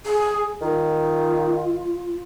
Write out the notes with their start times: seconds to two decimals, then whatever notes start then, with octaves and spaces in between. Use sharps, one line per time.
0.06 G#4
0.62 D#3 F4